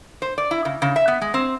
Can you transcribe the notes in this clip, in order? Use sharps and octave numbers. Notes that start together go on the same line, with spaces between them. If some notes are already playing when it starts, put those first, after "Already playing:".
C5
D5
E4
C#3
C#3
E5
B3
G#3
C4